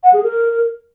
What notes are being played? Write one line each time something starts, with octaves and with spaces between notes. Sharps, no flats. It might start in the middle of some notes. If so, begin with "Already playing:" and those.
F#5
G#4
A#4